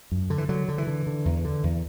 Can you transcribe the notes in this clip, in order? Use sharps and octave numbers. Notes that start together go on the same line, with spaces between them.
F#2
D3
E3
D3 F#3
D3
E3
D3
D3
E2
D3
E2